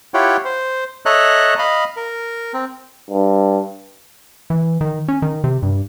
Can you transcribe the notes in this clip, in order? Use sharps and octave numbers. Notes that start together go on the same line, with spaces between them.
E4 F4 G4 C#5 F#5 G5
C5
A4 C#5 D#5 E5 A#5 F#6
D#5 F5 B5
A#4
C4
G2
E3
D#3
C#4
D#3
C3
G2